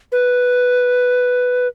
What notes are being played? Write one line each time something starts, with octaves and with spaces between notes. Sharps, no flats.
B4